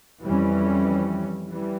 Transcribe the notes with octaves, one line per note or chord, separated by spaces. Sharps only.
F2 E3 G3 C#4
E3 G3